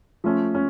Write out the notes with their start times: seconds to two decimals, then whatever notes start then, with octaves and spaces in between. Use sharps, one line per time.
0.24 F3 A3 C#4
0.55 C#4